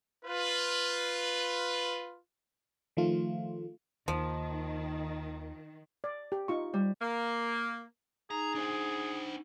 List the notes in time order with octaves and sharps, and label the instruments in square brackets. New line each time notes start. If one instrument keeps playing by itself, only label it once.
[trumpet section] F4 B4
[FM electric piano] D#3 F3 A3 F4
[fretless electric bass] D#2 [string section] D#3 [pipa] F3
[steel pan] D5
G4
D#4 F4 C#6
[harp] G3
[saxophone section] A#3
[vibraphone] D#4 [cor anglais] G#4 [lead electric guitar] A#5
[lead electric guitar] D4 C5